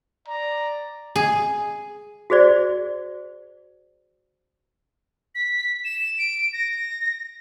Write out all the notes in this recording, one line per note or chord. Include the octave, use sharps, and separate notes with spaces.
D5 A#5
G#4
F#4 G#4 C5 D5
B6
E7
D7
A#6